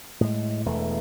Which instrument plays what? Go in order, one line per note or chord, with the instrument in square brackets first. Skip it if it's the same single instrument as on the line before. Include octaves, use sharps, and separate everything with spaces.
[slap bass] A2 G#3
E1 E2 E3 A3